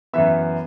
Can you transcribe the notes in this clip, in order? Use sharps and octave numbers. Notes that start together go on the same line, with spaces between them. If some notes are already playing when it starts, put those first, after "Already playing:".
F#2 E3 B3 E5